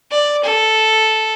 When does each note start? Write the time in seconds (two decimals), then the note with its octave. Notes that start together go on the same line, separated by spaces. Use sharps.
0.11 D5
0.43 A4